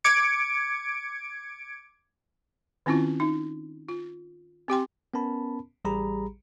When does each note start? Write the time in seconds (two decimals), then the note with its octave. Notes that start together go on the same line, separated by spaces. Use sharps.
0.04 D6 G#6 C#7 D7
2.86 D#3 C4 C#4 E4 F4
3.20 D#4
3.89 F4
4.68 C4 G4 G5 C6
5.14 B3 C#4 A#4 A5 B5
5.85 A1 G3 G4 G#4 A#5 B5